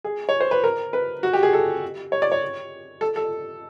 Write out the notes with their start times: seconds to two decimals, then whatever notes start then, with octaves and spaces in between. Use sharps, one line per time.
0.04 G#4
0.29 C#5
0.40 C5
0.51 B4
0.64 A#4
0.93 B4
1.23 F#4
1.33 G4
1.43 G#4
1.53 A4
2.12 C#5
2.22 D5
2.32 C#5
3.01 A4
3.16 A4